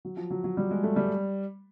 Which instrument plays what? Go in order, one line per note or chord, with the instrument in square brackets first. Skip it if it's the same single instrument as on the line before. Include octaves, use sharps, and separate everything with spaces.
[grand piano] F#3
F3
F#3
F#3
G3
G#3
A3
G3